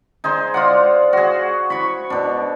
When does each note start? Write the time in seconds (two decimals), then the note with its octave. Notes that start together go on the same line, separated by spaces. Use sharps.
0.24 D#4 G#4 C5
0.54 F4 D5 F#5
1.13 F#4 G#4
1.70 B5 C#6
2.10 B2 D4